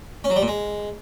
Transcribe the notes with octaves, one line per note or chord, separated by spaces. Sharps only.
C#4
F#3
G3
A#2
G#3